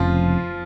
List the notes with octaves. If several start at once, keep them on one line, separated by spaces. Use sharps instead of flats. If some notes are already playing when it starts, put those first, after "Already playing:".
Already playing: F1 F2 C#3 F3 F4